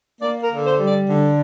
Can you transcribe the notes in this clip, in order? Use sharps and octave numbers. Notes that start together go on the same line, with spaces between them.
A#3 D5
A#4
D3
C5
G3
D5
D3